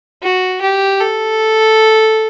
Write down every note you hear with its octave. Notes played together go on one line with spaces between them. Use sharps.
F#4
G4
A4